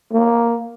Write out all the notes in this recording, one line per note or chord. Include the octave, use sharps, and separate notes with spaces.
A#3